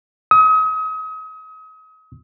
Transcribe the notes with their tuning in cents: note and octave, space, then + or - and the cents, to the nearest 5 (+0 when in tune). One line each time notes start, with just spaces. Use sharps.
D#6 +35